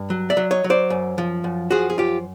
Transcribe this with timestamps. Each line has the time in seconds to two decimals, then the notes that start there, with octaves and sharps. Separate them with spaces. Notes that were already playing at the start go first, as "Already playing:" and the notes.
Already playing: G2
0.10 F#3
0.30 D5 E5
0.37 F#3
0.51 C#5 D#5
0.64 F#3
0.70 C5 D5
0.90 F#2
1.18 F3
1.44 F#2
1.71 F3 F#4 G#4
1.90 G#4
1.97 F#2 F4 G4